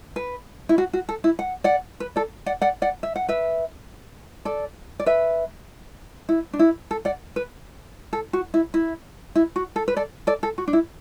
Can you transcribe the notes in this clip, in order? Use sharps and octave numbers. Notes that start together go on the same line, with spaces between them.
B4
E4
F#4
F#4
A4
E4
F#5
D5 F#5
B4
A4 D5
D5 F#5
D5 F#5
D5 F#5
E5
F#5
B4 E5
A4 D5
D5
B4 E5
E4
D4
E4
A4
D5 F#5
B4
A4
F#4
E4
E4
E4
F#4
A4
B4
A4 D5
A4 D5
A4
F#4
D4
E4